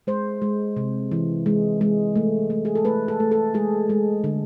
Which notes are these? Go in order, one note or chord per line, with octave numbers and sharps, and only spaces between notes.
G#3 C5
G#3
C3
E3
G#3
G#3
A3
A3
G#4
A4
A3 B4
A4
A3
A4
G#3 G#4
G#3
D3